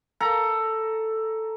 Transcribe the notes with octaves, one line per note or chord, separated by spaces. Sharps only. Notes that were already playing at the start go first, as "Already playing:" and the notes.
A4 A#5